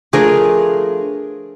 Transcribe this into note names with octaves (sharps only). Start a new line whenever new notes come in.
F3 A3 D4 G#4 A#4